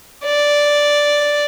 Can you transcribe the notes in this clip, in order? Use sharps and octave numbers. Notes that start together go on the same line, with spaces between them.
D5